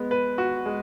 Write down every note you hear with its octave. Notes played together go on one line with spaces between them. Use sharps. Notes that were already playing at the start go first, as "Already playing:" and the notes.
Already playing: G#3 B3
B4
F#4
G#3